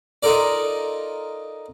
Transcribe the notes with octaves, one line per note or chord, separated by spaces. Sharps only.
D#4 F4 A4 A#4 D5